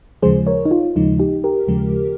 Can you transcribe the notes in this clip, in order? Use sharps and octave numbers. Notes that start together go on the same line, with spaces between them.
D#2 C#3 F3 G#3 G#4 C5
A#4 C#5
D#4
F4
D#2 C#3 F3 G#3 D#4
D#4 G4
G4 A#4
D#2 C#3 F3 G#3